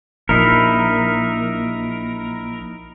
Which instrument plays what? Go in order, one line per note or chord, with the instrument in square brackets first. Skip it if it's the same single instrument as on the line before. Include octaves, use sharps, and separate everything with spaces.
[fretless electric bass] A#1 [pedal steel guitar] D#4 E4 A#4